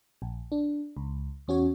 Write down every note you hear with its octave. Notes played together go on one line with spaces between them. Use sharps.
A#1
D4
C#2
E2 C#4 F#4 C#5